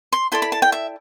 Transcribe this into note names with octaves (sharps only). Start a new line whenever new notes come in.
C6
E4 A4 D5 C6
B5
A5
G5
E5